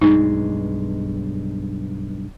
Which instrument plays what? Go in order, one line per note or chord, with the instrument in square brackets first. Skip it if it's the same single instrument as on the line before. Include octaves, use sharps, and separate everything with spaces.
[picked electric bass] B1 G2 G#3 [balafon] D#4